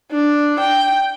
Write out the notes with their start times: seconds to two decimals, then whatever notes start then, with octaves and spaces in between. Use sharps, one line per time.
0.11 D4
0.60 G5